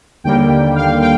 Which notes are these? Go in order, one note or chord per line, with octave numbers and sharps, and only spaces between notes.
D#2 D3 G3 A#3 G5
F5
G5